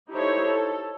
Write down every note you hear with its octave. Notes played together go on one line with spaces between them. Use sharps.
D#4 E4 G4 A4 C5 C#5
A4